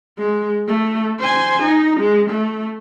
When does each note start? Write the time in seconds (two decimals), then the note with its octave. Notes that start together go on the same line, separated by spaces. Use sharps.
0.18 G#3
0.67 A3
1.20 C5 G#5
1.63 D#4
2.00 G#3
2.30 A3